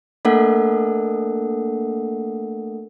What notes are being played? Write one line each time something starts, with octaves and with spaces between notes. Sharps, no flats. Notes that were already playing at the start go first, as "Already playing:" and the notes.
A3 A#3 D4 A4 A#4 F#5